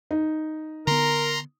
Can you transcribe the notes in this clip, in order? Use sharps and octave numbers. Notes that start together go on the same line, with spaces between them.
D#4
D3 B3 A#4 A#5 C6